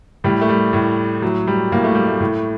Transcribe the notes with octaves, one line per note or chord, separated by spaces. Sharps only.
A2 G3
A3
G3
A2
A2 F#3
G3
A2 A#3
A3
G3
A3
A2